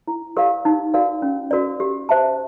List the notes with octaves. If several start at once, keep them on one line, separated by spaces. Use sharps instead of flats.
E4
G4 A#4 D5 F5
D#4
F#4 A#4 D5 F5
C#4
F#4 A#4 D5
G4
C5 E5 A5